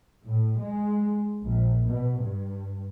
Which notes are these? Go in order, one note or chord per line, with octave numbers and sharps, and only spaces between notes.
A2
G#3
A#1
B2
G2